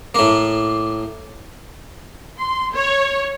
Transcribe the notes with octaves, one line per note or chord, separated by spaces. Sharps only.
A2 A#3
C6
C#5